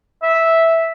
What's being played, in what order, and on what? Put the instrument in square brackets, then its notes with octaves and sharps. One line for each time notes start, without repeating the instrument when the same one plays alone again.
[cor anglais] E5